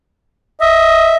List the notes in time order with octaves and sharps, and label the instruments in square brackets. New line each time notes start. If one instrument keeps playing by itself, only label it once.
[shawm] D#5 [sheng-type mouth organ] E5